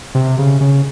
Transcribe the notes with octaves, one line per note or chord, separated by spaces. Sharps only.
C3
C#3
C#3